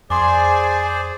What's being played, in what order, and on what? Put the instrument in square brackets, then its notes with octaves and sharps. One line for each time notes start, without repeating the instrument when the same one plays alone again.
[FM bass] F2 [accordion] G#4 C5 D5 [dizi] G#5 [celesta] C6 D6